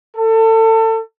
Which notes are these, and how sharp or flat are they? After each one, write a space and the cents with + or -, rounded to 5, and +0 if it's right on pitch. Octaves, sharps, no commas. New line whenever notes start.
A4 +30